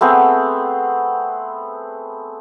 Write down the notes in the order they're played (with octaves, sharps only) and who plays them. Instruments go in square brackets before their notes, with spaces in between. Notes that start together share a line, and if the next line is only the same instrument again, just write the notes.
[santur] A3 B3 C4 G#4